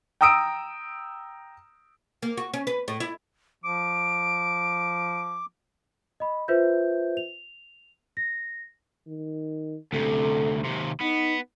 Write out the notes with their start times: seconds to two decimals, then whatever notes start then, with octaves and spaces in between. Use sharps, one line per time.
0.21 G5 A#5 D#6 E6 D7
2.22 A#3
2.37 F#4
2.53 C#4
2.67 B4
2.88 A2
3.00 E4
3.64 F3 D6 D7
6.20 D#5 B5
6.48 F4 B4 C5 E5 G6
7.17 F7
8.17 A#6
9.08 D#3
9.93 D2 C3 A4
10.65 D#2 C3
11.01 B3 D#4